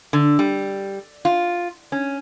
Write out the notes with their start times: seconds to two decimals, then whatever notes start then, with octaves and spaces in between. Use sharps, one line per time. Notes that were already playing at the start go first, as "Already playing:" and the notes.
0.13 D3
0.39 G3
1.25 F4
1.92 C#4